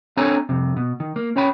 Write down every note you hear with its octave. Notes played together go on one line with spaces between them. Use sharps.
C4 D4 A4 C#5 G#5 A#5
C2 F2 C3
B2
D#3
A#3
C#4 C#5 G5 B5